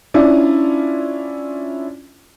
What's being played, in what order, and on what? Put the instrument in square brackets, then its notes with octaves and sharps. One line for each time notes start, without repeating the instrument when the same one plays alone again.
[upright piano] C#4 D4 E4 F4 D5